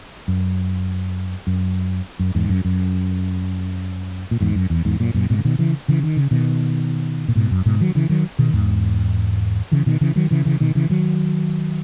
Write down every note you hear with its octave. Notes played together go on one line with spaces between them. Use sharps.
F#2
F#2
F#2
E2 G#2
F#2
F#2
A#2
E2 G#2
F#2
E2
E2 G#2
F#2 A#2
F#2 A#2
G#2 B2
C#3
B2 D#3
C#3 E3
C#3 E3
D#3
C#3
B2 D#3
A#2
G#2 B2
F#2
G#2 B2
D#3 F#3
C#3 E3
D#3 F#3
B2 D#3
E2 G#2
C#3 E3
B2 D#3
C#3 E3
D#3 F#3
C#3 E3
C#3 E3
B2 D#3
C#3 E3
D#3 F#3